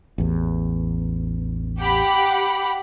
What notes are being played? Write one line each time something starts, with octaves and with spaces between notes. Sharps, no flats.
A1 E2
G4 F#5 B5